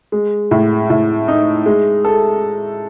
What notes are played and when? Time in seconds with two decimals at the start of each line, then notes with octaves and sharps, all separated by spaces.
0.12 G#3
0.51 A2
0.90 A2
1.28 D#4
1.66 G#3
2.05 A4